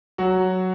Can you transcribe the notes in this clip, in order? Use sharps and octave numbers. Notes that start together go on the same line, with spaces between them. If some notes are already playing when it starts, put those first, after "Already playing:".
F#3 F#4